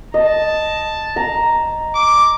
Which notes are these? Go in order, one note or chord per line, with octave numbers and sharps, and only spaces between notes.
D#5 A5
A#5
D6